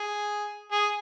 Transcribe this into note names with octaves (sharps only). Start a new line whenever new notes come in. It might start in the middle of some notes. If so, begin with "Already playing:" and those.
Already playing: G#4
G#4